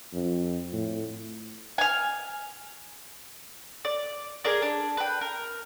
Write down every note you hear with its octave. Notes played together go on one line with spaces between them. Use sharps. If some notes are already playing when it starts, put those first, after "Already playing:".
F2
A2
G#5 F6
D5
G#4 A#4 D5
D4
B4 G5
A#4